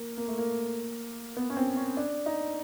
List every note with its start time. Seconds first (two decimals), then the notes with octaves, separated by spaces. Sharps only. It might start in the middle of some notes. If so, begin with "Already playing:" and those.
Already playing: A#3
0.18 A#3
0.28 A3
0.38 A#3
1.37 B3
1.50 C#4
1.57 C4
1.77 C#4
1.97 D4
2.26 D#4